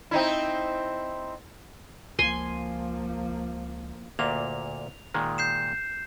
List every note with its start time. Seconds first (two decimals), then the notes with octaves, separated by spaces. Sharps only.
0.11 C4 D#4 E4
2.19 C#2 F3 A#3 G#5 C6
4.19 D2 A#2 A#3 F7
5.14 A#2 D#3 G#3
5.38 G6 C7 E7